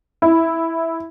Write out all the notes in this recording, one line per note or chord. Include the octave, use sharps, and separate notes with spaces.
E4